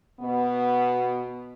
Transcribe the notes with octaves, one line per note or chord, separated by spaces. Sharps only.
B2 B3